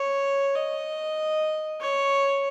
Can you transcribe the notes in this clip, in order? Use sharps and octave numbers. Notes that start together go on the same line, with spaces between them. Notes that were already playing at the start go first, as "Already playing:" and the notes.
Already playing: C#5
D#5
C#5